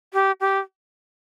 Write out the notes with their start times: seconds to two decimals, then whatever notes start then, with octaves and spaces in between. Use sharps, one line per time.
0.13 G4
0.41 G4